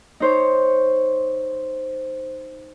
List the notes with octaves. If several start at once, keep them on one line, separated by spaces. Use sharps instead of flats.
D#4 C5 C#5